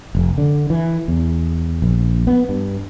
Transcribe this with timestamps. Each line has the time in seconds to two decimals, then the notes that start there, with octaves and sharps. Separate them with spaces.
0.15 F1
0.38 D3
0.70 E3
1.08 E2
1.82 A#1
2.27 B3
2.49 G2